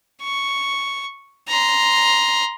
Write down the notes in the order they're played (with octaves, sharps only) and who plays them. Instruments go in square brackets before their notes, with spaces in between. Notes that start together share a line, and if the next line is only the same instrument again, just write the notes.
[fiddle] C#6
A#5 C6